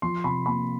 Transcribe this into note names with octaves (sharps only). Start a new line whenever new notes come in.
F3 C6
C3 B5
A#3 B5